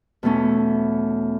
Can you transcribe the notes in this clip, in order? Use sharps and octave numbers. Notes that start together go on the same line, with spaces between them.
E2 B2 A3 C#4